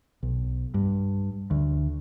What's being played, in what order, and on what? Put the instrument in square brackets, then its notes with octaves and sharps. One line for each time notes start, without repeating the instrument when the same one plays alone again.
[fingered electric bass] B1
G2
D2